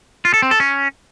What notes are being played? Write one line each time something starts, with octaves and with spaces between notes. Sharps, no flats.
F4
A4
C4
A4
C#4